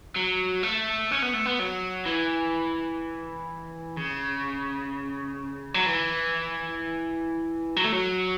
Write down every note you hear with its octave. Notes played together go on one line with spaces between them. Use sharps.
F#3
A3
C#4
B3
A3
B3
F#3
E3
C#3
F#3
E3
F#3
A3
F#3